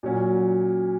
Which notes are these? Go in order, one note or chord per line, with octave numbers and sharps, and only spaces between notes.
A#2 F#3 C#4 F#4